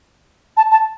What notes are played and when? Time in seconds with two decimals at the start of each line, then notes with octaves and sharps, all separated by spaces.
0.57 A5
0.71 A5